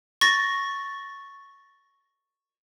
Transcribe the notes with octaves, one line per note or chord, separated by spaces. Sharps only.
C#6 A6 A#6